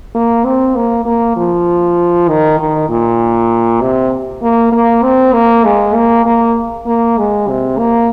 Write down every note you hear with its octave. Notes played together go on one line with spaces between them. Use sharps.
A#3
C4
A#3
A#3
F3
D#3
D#3
A#2
C3
A#3
A#3
C4
A#3
G#3
A#3
A#3
A#3
G#3
C3
A#3